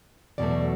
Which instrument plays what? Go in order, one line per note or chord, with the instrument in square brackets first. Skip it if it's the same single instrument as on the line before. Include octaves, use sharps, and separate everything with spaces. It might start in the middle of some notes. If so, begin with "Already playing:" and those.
[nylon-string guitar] E2 B2 F#3 A3 D5